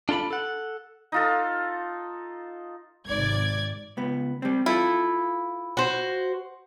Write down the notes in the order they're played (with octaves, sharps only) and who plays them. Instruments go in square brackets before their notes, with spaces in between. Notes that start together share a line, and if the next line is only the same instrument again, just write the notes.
[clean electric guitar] D4 F4 A4 A#5 B5
A4 F#5
[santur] D#4 F4 A4
[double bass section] G#1 C3 [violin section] D5 D6 G#6
[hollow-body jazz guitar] C#2 B3
G3 C4
[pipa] E4 [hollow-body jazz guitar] F4 A4
[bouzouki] F#4 C5